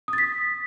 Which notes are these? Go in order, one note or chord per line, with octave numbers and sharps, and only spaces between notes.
D#6
A6
B6